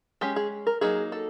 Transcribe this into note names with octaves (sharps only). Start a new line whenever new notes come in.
G#3 C#4 G4
G#4
A#4
F#3 A#3 D#4 G#4
A4